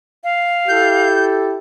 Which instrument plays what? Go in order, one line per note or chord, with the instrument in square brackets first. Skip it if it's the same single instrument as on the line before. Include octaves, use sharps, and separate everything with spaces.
[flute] F5
[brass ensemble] E4 G4 A4 [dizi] G6